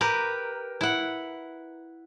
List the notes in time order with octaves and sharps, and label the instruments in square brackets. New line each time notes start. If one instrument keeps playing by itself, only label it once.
[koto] G4 A#4 B4
E4 F#5